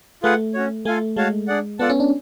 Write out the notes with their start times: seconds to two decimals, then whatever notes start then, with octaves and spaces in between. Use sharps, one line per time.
0.23 A3 F4 G#4 B4 F#5
0.54 C#4 F#4 C#5
0.85 A3 F4 A4 F5 G#5
1.16 G#3 F#4 C#5 F5 A5
1.48 D4 G#4 D5 F#5
1.79 B3 F4 A4 D5 F#5 A5
1.90 C#4
2.00 D4